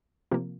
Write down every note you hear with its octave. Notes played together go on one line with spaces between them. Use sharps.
C3 F3 A#3